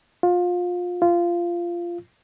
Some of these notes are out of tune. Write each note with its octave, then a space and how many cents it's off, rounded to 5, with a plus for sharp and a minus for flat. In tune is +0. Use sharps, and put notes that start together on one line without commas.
F4 +25
F4 -15